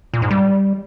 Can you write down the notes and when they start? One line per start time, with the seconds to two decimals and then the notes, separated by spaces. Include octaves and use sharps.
0.14 A#2
0.22 G#2
0.31 G3